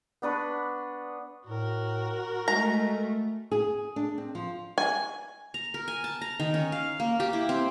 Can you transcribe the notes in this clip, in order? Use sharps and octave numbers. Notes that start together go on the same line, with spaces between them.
B3 D4 B4 C#5
A2 F#4 A#4
G#3 A3 A#5
G#4
D4
C4
F3
G#5
A#5
A#4
G#5
A5
A#5
D#3
C#4
F5
A#3
G4
E4
C4